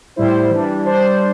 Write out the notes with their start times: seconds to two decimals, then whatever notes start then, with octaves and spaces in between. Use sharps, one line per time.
0.16 A2 G3 E4 C5
0.50 E3 G3 D4
0.85 G3 D4 C5